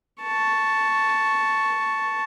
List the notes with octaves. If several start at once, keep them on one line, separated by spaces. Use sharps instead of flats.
A5 C#6